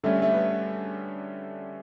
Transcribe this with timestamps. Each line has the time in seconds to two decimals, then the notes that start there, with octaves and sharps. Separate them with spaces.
0.04 D3 G3 A3 C#4
0.22 A3
0.32 B3